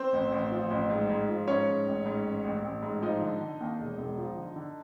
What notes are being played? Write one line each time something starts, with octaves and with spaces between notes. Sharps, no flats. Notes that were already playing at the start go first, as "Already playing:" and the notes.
Already playing: C4 C5
A1
A1
F3
A1
G#2
G#2
F3
G#2 C#4 C#5
G#2
A1
G#2
A1
A1
A1
G#2
F3 D#4 D#5
D3
D3
D#2
E1
E1
F3
D3
D3